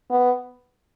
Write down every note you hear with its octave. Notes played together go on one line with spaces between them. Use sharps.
B3